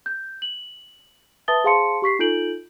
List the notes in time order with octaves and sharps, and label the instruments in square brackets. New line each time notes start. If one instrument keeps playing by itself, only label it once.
[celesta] G6
F#7
B4 E5 A5 D#6 A6 G7
G#4 C5 F5 A5 C6 C#7
G4 C#6 B6 C7
D#4 F4 A4 G6 D7 F#7